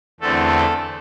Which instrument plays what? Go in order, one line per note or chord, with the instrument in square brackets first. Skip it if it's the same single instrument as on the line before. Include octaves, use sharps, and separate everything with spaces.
[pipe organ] E2 D3 A3 C4 A4